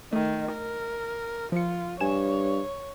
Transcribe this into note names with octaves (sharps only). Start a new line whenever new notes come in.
D#3 A3
A#4
F3 F4 C#7
G2 C#5 G#5 E7